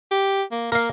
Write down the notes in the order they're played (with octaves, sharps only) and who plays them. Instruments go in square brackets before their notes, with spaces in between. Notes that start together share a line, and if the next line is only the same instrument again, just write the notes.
[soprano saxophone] G4
A#3
[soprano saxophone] A#3 [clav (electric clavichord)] A#4 F5